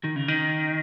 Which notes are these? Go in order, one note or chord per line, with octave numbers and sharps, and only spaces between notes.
D#3
C#3
D#3